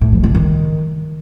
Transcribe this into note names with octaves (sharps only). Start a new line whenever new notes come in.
A2
F3
D3
D#3